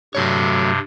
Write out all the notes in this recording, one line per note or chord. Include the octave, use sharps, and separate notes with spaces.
G2 C3 F#3 A3 C#5